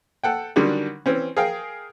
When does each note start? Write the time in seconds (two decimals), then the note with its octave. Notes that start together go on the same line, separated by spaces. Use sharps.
0.24 A4 F#5 G5
0.56 D3 D#3 F#3 G3 C#4 D4
1.06 E3 C4 C#4
1.37 G#4 A#4 F5 G5